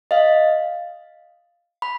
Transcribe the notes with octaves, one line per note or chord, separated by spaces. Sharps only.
D#5 F5
B5